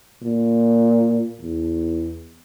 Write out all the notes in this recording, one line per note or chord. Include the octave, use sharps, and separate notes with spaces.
A#2
E2